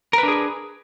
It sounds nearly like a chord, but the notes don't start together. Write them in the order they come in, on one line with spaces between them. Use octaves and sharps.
A#4 B4 D4 G#4